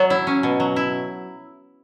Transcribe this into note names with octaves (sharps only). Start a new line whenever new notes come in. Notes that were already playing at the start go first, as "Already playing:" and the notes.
Already playing: F#3 C#5
E4
C#4
B2
F#3
E4